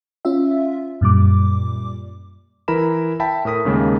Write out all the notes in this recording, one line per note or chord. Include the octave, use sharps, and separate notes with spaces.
C#4 F4 E5
F#2 A#2 G3 D6
E3 E4 A#4 A#5 B5 E7
E5 G5 A5 B5 B6
A2 A#4 D#6 B6
D#2 C#3 G#3 A#3